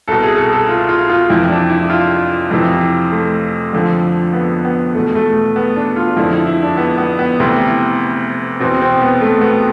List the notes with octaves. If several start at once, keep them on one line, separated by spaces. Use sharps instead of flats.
C2 B2 A4
G#4
A4
A4
F4
F4
F4
F2 C3 E3 E4
D4
E4
F4
F2 C3 E3
A3
F2 D3 F3
B3
B3
E2 B2 A3
A3
B3
D4
F4
F2 D3 F3 E4
E4
E4
D4
B3
B3
B3
D2 C3 E3
E2 B2 C4
C4
B3
A3
B3